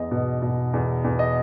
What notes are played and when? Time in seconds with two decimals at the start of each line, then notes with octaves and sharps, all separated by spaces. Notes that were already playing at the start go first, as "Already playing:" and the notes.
Already playing: E2 D#5
0.11 B2
0.42 B2
0.73 E2
1.04 E2
1.19 D#5